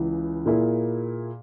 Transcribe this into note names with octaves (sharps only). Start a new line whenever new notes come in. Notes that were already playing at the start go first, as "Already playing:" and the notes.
Already playing: C#2 C#3 E3
A#2 A#3 E4 G#4